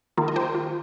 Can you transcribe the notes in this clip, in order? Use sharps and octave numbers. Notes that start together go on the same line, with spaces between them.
D#3 A#3 F4 A#4
D#5
G4 C5
F4